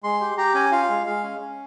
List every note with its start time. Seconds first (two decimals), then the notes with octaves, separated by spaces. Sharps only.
0.03 G#3 C6
0.21 G4
0.38 G4 A#5
0.54 C#4 G#5
0.72 F4 F5
0.89 G#3
1.06 G#3 F5
1.23 C#4
1.41 C#4